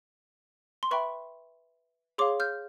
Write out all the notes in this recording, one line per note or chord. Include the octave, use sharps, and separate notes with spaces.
C6
B4 E5 G5 B5 C#6
G#4 C#5 F5 C6 D6
F6 G6